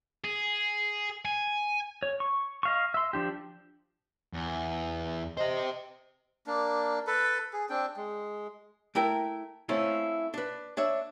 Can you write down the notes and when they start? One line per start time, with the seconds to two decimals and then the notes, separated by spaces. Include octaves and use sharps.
0.24 G#4
1.25 G#5
2.03 C#5
2.20 C#6
2.63 D#5 F5 C#6
2.94 E5 C6
3.13 F3 D4 G4
4.33 E2
5.37 G4 C5 D#5
6.47 A#3 D4
7.07 A4 B4
7.53 G#4
7.69 C4 D4 G5
7.97 G#3
8.95 A3 E4 A#4 G5
9.69 A3 C4 C#4 E4 F4
10.34 D4 B4
10.77 D4 C#5 E5